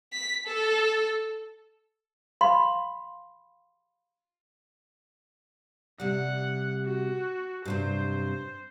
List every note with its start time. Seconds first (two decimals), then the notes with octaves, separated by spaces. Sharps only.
0.13 B6
0.46 A4
2.41 F5 B5 C6
6.00 C3 G3 F#5
6.85 F#4
7.65 G2 C3 F#3 C5